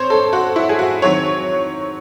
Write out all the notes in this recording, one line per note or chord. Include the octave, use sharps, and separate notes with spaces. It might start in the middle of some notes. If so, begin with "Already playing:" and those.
Already playing: C4 C5 C#5
A4
F#4
E4
G#4
F#4
D#3 F#3 C4 C#5